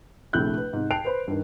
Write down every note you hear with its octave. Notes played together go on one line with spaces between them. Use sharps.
A#1 C3 A3 E4 F#6 G6
B4
G#2 C3
G5 A5 F#6 C7 D7 F7
B4 C5 B5
G2 D#3